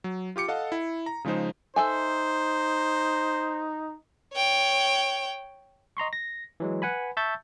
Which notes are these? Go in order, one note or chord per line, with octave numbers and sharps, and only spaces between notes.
F#3
F4 G4 D6 C#7
A4 D#5 F5 F#5 A5
E4
A#5
C#3 F3 G#3 D#4 C5
D#4 A4 C5 E5 G#5
C#5 G5
D#5 A#5 C6 C#6
A#6
E3 F#3 G#3
B4 F#5 G#5 B5
E5 A5 C#6 E6 G6 A6